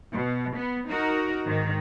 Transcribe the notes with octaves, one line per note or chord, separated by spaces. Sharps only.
B2
B3
D#4 F#4 A#4
G#2 D#3